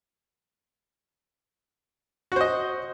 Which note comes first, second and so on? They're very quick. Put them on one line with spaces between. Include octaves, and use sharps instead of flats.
F#4 C5 D#5